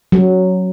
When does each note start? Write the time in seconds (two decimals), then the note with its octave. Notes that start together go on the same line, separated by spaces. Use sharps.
0.12 F#3